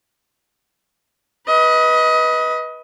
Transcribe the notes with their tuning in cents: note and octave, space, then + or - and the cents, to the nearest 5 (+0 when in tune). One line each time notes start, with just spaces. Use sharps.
B4 -10 D#5 +25